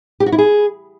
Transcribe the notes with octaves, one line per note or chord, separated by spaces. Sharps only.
G4
F#4
E4
G#4